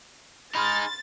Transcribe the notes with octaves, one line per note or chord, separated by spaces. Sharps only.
D#4 G#4 B5 C6 F6 A6